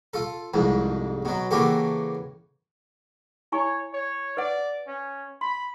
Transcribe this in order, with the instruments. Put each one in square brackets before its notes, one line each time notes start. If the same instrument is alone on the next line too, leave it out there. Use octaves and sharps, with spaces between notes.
[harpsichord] F4 A4
C2 F2 G#2
B2 F#3
C#3 E3 A#3 F#4 G4 A4
[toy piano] E4 G#5 C#6 [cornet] C#5
[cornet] C#5
[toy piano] B4 C5 F#5 [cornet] D5
[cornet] C#4
[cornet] B5 [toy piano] C6